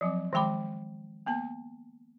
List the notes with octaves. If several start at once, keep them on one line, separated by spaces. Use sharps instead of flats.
F3 F#3 C4 D6
D#3 F3 G#3 G5 B5 D6
A#3 B3 A5